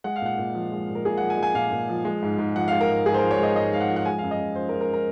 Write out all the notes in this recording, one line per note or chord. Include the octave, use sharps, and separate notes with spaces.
G#3 F#5
F5
A#2 F#5
A#2
F3
G#3
A#2
A#4
A#2 G#4
F3 F#5
G#5
G#3
G#5
A#2 F5
A#2
F3
G#3
G#2
G#2
F3 F#5
F5
G#3
A#4
G#2
G#2 G#4
C5
F3 A#4
C#5
G#3 D#5
G#2 D#5
G#2 F5
F#5
F3
F#5
G#3 G#5
F5
F#2
D#5
F#2
F3 C5
A#4
G#3
A#4
A#4